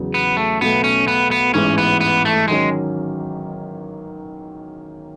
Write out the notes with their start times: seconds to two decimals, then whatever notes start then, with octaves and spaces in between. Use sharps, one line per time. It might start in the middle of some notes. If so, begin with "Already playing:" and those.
Already playing: E2 C#3 F#3
0.14 B3
0.37 A3
0.61 B1 B2 A3 B3
0.84 C#4
1.08 B3
1.31 B3
1.54 A1 G#2 E3 C#4
1.78 B3
2.01 B3
2.25 A3
2.48 D#3 F#3 G#3 C#4